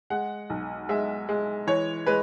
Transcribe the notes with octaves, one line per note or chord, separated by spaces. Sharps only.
G#3 F#5
B1
G#3 E5
G#3
E3 C#5
G#3 B4